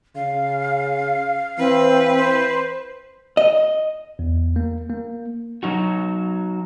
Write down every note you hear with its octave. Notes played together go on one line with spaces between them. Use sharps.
C#3 F5
E3 C4 B4
C5
D#5
E2
A#3
A#3
F#3 D#4 F#4